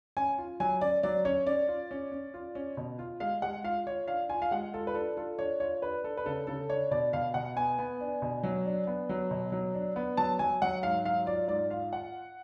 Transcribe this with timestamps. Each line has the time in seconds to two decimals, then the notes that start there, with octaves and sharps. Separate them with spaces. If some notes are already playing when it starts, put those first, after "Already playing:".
0.17 C#4 G#5
0.38 F4
0.60 F#3 G#5
0.81 C#4 D5
1.03 F#3 D5
1.25 C#4 C#5
1.46 C#4 D5
1.68 F4
1.91 C#4
2.12 C#4
2.34 F4
2.55 C#4
2.77 B2
2.99 F4
3.20 G#3 F5
3.42 G#3 F#5
3.64 F4 F5
3.87 F4 C#5
4.08 D4 F5
4.29 F4 G#5
4.42 F5
4.51 G#3 F#5
4.73 F4 A4
4.87 B4
4.95 D4 A4
5.17 F4 A4
5.39 D4 C#5
5.60 F4 C#5
5.82 D4 B4
6.04 D4 A4
6.17 B4
6.26 C#3 A4
6.47 C#3 A4
6.70 D4 C#5
6.91 B2 D5
7.13 B2 F5
7.34 B2 F#5
7.56 B3 G#5
7.79 B3
8.00 D4
8.22 B2
8.43 F#3
8.66 D4
8.87 B3
9.09 F#3
9.31 B2
9.52 F#3
9.74 D4
9.96 B3
10.17 F#3 A5
10.39 F#3 G#5
10.62 F#3 F#5
10.83 G#2 F5
11.05 F#3 F5
11.26 F4 D5
11.48 G#2 D5
11.70 F4 F5
11.93 F#5